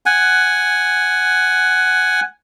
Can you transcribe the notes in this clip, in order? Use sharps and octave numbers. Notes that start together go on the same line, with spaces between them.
F#5 G#5